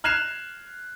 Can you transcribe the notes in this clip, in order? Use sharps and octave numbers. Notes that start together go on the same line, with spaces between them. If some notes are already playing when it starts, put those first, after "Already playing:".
F6 F#6 G#6 C7 E7 F7